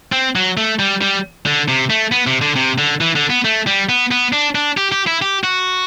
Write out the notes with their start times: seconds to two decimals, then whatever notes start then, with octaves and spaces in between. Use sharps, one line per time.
0.12 C4
0.36 F#3
0.57 A3
0.79 G3
1.02 G3
1.46 D3
1.68 C3
1.90 A3
2.12 B3
2.27 C3
2.41 D3
2.56 C3
2.78 D3
3.01 E3
3.15 D3
3.30 B3
3.44 A3
3.67 G3
3.89 B3
4.11 B3
4.33 D4
4.55 D4
4.77 G4
4.92 G4
5.07 E4
5.22 G4
5.44 F#4